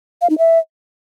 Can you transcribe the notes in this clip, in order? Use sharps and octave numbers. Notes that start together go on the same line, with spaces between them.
F5
D#4
E5